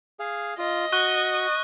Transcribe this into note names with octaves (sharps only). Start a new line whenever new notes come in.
G#4 F5
F4 D#5
F#4 C#6 F#6 G7